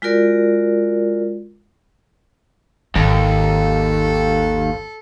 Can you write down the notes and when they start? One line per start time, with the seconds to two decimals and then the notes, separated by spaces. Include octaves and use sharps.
0.02 G#3 F4 F#4 A#4 D5
2.95 G#1 D#2 A4